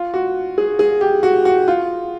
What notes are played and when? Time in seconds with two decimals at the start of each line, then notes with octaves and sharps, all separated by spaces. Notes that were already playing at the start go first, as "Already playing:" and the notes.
Already playing: F4
0.14 F#4
0.58 G#4
0.79 G#4
1.01 G4
1.23 F#4
1.45 F#4
1.68 F4